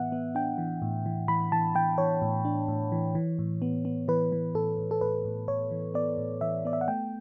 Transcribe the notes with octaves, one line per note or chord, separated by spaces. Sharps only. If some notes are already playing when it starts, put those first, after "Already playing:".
Already playing: A2 E3 B3 E5 F#5
B3
D4 G5
E3
A2
E3
E3 B5
E3 A5
E3 G5
E3 C#5
A2
D4
A2
E3
E3
A2
B3
B3
E3 B4
E3
A2 A4
A2
A4
A2 B4
A2
A2 C#5
E3
B3 D5
A2
E3 E5
B3 D5
E5
F#5
A3 G5